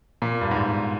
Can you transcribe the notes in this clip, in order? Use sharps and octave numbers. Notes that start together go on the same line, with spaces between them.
A#2
G2
G#2